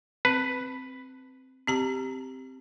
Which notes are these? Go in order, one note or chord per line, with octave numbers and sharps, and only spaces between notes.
C4 B4
C4 G4 A#5